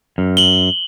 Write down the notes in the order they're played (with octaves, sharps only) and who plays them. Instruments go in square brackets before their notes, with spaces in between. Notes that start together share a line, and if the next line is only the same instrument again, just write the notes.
[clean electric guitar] F#2
[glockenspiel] F#7 G7